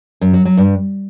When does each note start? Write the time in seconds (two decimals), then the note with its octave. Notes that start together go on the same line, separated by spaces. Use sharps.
0.21 F#2
0.33 F#3
0.45 F#3
0.57 G2